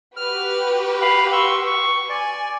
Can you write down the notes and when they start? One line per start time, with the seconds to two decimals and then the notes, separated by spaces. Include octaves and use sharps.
0.17 F#4 G4 B4 F6
1.02 F5 B5
1.32 C6 C#6 E6
1.66 C#6
2.10 D5 G#5